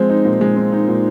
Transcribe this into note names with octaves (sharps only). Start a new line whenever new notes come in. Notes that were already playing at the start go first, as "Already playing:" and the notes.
Already playing: F3 G#3 C4
D#4
A#2
G#3
C4
D#4
A#2